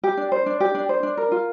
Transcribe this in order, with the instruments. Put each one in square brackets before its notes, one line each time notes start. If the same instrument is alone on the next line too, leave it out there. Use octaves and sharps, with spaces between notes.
[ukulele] G4
D4
C5
D4
G4
D4
C5
D4
A#4
F4